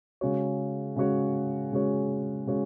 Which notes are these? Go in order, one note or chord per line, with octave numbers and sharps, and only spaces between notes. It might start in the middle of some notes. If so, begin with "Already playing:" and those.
C#3 G#3 C#4 F#4 C#5
C#3 G#3 C#4 F#4 C#5
C#3 G#3 C#4 F#4 C#5
C#3 G#3 C#4 F#4 C#5